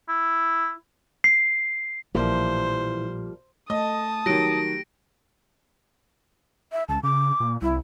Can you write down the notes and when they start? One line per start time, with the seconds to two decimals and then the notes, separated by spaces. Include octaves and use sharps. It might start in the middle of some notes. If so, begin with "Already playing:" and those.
0.09 E4
1.24 C7
2.15 A#1 A2 E3 F3 G3 A#3 C5
3.70 A3 D#5 A5 D#6
4.26 D#3 F#3 G4 A#6 D7
6.72 E5
6.89 C#2 A5
7.03 C#3 D6
7.40 A#2
7.62 C2 E4